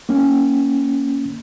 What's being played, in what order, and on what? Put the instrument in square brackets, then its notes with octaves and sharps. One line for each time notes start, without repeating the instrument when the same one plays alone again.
[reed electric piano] A#3 C#4